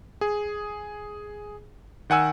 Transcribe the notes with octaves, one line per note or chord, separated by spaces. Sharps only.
G#4
D#3 F#5 G#5 E6